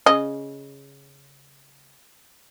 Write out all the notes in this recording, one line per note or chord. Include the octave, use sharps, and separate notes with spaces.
C#3 D#5